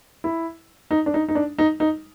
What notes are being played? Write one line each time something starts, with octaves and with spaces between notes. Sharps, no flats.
E4
D#4
D4
D#4
D#4
D4
D#4
D#4